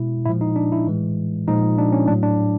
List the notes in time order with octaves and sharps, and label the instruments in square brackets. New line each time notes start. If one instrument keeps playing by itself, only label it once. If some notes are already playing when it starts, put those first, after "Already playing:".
Already playing: [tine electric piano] B2 G#3 E4
A#2 F3 G#3 E4
D#4
D4
E4
A2 E3 G#3
A#2 F3 G#3 D#4
D4
C#4
A2 F#3 D4
D4